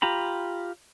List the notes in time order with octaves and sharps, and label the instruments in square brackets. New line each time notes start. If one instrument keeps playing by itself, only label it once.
[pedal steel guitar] F4 G4 A#5 B5